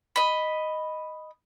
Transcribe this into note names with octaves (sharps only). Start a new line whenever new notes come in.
D#5 B5